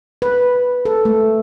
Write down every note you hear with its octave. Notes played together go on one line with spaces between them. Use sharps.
B4
A4
A3